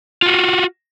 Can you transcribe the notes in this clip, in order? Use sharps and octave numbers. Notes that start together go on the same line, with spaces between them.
F4 F#4